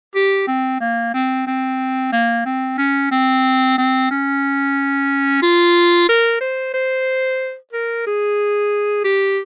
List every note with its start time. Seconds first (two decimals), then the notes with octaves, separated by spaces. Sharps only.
0.15 G4
0.47 C4
0.80 A#3
1.14 C4
1.47 C4
2.12 A#3
2.45 C4
2.78 C#4
3.11 C4
3.78 C4
4.11 C#4
5.42 F4
6.08 A#4
6.40 C5
6.74 C5
7.73 A#4
8.06 G#4
9.04 G4